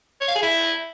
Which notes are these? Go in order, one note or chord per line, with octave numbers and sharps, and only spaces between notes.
C#5
F5
G#4
E4